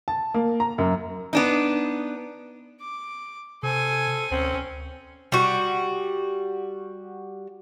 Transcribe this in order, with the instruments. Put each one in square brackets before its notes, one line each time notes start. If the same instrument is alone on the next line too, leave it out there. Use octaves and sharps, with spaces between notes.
[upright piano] A5
A#3
A#5
F#2
[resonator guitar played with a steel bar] B3 D4 D#4
[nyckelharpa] D6
[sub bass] C3 [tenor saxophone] A4 [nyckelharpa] C5 G#5
[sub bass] D2 [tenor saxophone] C4 [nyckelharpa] C#4
[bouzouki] G3 F#4